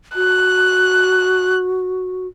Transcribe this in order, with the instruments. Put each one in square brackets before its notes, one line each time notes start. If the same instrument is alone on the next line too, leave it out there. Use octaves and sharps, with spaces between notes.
[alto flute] F#4 [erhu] F#6